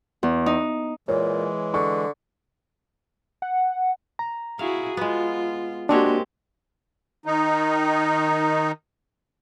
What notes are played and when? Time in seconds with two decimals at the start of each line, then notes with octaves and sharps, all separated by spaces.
0.23 E2
0.46 D#4
1.08 A#2 E3 G#3 C#5
1.74 D3 C#6
3.42 F#5
4.19 A#5
4.59 E4 F#4 G#4 F5
4.97 G#3 B3 F4
5.89 G#3 A#3 C4 D4 F#4 G4 C#5
7.26 D#3 D#4